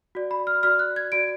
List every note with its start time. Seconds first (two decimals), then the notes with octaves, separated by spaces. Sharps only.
0.15 F#4 D5
0.31 B5
0.47 F6
0.63 F#4 D5 F6
0.79 F#6
0.96 G#6
1.12 F#4 D5 D7